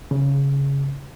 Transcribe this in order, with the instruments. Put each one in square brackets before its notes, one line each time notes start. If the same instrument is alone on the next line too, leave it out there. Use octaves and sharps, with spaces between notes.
[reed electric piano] C#3